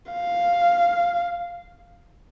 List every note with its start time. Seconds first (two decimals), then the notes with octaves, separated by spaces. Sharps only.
0.12 F5